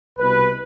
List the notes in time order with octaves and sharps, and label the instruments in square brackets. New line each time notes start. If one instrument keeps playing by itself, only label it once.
[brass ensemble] C2 B2 B4